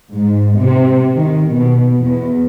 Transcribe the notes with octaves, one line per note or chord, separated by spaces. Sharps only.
G#2
C3
D#3
B2
E2